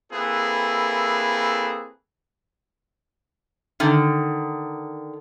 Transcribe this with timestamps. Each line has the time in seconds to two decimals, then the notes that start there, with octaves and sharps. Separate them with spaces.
0.12 A#3 C4 E4 G#4 A4 B4
3.80 D3 D#3